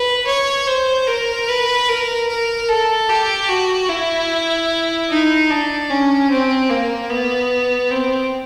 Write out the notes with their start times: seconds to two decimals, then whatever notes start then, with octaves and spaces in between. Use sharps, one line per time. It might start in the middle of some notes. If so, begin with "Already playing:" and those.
Already playing: B4
0.27 C#5
0.67 C5
1.07 A#4
1.48 B4
1.89 A#4
2.29 A#4
2.69 A4
3.09 G4
3.49 F#4
3.89 E4
5.10 D#4
5.50 D4
5.90 C#4
6.30 C4
6.70 A#3
7.10 B3
7.91 C4